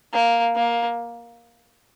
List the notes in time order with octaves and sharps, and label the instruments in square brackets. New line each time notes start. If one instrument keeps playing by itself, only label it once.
[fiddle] A#3
A#3